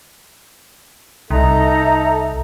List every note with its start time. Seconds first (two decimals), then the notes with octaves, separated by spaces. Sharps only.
1.31 C2 D#4 A4 E5 A#5